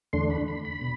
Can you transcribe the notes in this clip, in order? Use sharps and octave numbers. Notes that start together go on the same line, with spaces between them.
E2 D3 A3 D4 C6
B5
B5
B5
B2